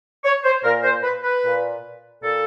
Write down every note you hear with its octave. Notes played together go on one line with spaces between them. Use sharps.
C#5
C5
A#2 A#4
C5
B4
B4
A#2
A#2 A4